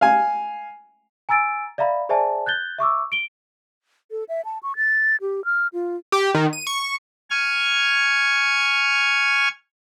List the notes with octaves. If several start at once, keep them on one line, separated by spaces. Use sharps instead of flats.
F5 G#5
G#5 A#5 E6 A6 D7
D5 E5 F5 A#5 B5
G#4 C5 D5 E5 G#5 A5
F#6 G6 A6 G7
E5 C#6 D6 E6
D7 G7
A4
E5
A5
C#6
A6
G4
F6
F4
G4
D#3
D#7
C#6
G#5 C#6 F6 G#6